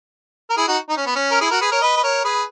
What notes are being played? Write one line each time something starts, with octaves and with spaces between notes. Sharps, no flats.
A#4
E4 G#4
D#4 F#4
D#4
C#4
B3
C#4
A#4
E4 G#4
F#4 A#4
G#4 B4
A#4 C#5
B4 D#5
B4
A#4 C#5
G#4 B4